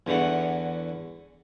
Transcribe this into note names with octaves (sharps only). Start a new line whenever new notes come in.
E2 D3 E3 F#4 F#5